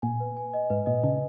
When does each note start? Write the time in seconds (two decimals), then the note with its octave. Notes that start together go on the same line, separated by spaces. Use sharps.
0.02 A#2 G#5
0.20 B4
0.37 G#5
0.54 D#5
0.70 G#2 B4
0.86 A#2 D#5
1.04 C#3 D#5